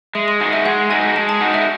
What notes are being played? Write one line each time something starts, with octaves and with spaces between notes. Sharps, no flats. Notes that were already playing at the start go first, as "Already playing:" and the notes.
G#3 E5
C6
D#4 F#4 G#5
E5
G#3 F#5
D#4 F#4 G#5
G#3 A5
A5
D#4 F#4 F#5
E5